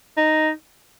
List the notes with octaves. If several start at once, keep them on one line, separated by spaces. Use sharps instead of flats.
D#4